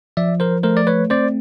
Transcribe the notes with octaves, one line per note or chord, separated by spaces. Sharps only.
F3 D5 E5
A#4 C5
A3 A#4 C5
D5
B4 C#5
C4 C5 D5